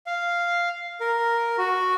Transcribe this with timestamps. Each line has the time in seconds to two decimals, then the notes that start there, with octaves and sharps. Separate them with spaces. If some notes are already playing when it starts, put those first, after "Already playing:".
0.07 F5
1.01 A#4
1.58 F#4